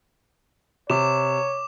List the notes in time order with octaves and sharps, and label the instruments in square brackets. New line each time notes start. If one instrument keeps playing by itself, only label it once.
[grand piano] C3 [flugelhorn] C#5 [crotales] D6 E7